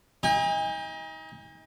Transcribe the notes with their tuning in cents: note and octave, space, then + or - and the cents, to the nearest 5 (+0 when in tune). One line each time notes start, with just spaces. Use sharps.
D#4 +30 G#5 -40